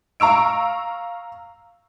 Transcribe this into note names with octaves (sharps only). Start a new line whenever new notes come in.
F5 A#5 C#6 E6 D7